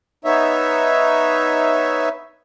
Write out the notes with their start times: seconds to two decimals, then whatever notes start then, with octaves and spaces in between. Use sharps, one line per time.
0.25 B3 D#4 C#5 E5